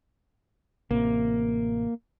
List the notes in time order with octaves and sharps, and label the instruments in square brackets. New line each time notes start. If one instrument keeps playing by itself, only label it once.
[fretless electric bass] A1 C3 [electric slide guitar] A#3